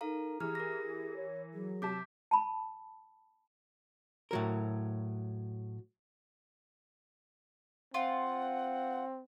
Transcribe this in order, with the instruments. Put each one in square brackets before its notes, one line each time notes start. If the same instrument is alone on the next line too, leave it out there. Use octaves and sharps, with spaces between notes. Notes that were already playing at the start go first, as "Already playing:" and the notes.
[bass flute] D#4 [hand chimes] A4 F5 A#5 [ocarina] A#4
[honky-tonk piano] E3 [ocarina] G4 [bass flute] G#4 [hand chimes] A#5 F6
[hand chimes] A#4 A#6
[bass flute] C#5
[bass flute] F#3 [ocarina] G#4
[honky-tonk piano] C3 A5 [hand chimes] D6 G6 B6
[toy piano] A5 B5
[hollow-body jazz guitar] A2 F#3 A#4
[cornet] C4 [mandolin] F4 [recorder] F#5